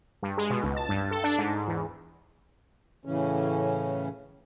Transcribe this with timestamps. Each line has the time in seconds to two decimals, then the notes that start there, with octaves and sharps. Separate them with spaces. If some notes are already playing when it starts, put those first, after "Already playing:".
0.23 G2
0.37 G#3
0.50 B2
0.63 C#2
0.76 A5
0.89 G2
1.11 A4
1.24 D4
1.38 G#2
1.68 E2
3.05 A2 C#3 E3 C#4